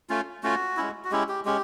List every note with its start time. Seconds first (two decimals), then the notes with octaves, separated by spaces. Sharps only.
0.09 A3 C#4 F4
0.43 A3 C#4 F4 F#4
0.77 G#3 C#4 E4
1.04 F#4
1.11 G#3 C#4 E4 G4
1.28 G4
1.45 G#3 C#4 G4